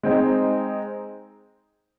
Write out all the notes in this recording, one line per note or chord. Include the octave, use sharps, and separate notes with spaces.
G#3 C4 D#4